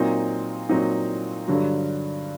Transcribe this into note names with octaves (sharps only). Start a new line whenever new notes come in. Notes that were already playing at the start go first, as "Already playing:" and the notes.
Already playing: A#2 F#3 C4 D#4
A#2 F#3 C4 D#4
G2 D3 F#3